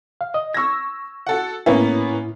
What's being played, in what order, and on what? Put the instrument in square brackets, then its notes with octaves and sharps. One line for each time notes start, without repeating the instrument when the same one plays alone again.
[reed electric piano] F5
D#5
[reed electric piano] C#6 G#6 [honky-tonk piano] E6 A#6
[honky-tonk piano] F#4 A4 F#5
[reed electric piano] A2 E4 [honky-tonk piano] A#3 B3 C#4